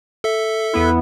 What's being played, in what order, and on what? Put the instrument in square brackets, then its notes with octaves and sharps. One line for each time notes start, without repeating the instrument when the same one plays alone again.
[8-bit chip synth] A4 E5
[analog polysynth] E2 B3 E4